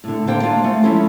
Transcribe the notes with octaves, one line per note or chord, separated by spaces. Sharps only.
A2 D3
D3 A#3 D4 C5 F5 G5
A#3 D4 F4 F5
A3 F4 F#5 G#5
F3 G#3 C#4 E4 F4 A4